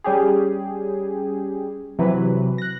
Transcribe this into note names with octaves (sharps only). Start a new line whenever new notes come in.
G3 C#4 G4 G#4
C3 E3 F#3 B4
F#6 A#6